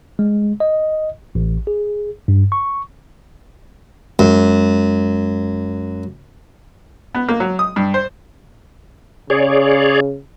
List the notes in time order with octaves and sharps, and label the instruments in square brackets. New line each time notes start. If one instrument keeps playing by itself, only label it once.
[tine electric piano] G#3
D#5
A1
G#4
G2
C#6
[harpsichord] F#2 [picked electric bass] G#3
[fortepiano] B3
A#3
F#3
D#6
G2
C5
[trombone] C#3 [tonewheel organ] G#4 C#5 D5